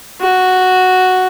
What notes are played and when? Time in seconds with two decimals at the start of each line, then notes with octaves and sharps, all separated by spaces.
0.21 F#4